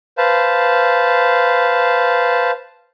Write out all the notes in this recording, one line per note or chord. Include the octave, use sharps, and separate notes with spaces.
B4 C5 F5 A5